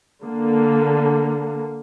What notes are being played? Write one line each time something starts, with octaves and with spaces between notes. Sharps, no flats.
D3 A#3